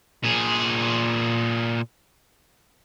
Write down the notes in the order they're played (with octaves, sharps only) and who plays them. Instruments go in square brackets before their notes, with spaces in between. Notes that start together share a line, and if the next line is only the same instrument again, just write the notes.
[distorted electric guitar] A#2 G#4